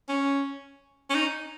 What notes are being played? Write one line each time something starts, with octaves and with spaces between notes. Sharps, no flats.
C#4
C#4
D#4